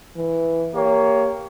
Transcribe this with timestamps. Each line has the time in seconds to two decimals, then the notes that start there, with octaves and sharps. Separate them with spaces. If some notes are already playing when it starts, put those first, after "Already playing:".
0.16 E3
0.75 A#3 G4 C#5